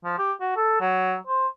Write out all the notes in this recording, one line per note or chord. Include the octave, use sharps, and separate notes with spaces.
F3
G4
F#4
A4
F#3
C5